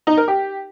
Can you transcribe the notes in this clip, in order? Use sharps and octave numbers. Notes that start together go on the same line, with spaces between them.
D#4
A#4
G4